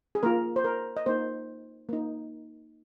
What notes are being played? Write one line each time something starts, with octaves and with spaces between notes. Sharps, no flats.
G#4
A#3 F4 A#4
C5
A#4
D#5
A#3 D#4 C5
A#3 D#4